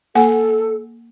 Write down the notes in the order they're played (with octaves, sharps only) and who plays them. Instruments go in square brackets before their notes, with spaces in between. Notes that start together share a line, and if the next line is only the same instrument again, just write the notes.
[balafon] A#3 F#5 G#5 [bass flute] A4